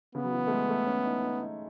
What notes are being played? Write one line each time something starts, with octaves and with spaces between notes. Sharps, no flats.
C#3 B3
F#3
E3
A3
G#3
A3
C#4
D#4
D#4
D#4